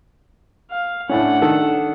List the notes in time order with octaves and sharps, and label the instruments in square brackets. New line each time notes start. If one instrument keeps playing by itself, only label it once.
[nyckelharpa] F5
[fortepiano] A2 A3 C#4 [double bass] D4 [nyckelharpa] F#5
[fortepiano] D#3 A4